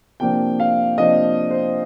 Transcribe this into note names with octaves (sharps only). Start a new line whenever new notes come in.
C3 F3 A#3 D4 G5
F5
C3 F3 A#3 D4 D#5
C5